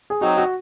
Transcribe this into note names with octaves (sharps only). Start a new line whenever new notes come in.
G#4
F#3 C4 D#4 F#4
F#4